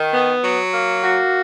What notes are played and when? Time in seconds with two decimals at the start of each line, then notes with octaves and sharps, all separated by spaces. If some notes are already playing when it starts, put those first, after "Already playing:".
Already playing: D#3
0.13 B3
0.43 F#3
0.72 A#3
1.03 F#4